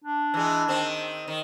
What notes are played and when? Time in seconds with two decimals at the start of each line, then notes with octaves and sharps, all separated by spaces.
0.04 D4
0.34 E3 G#3
0.68 D#3 C4
1.28 D#3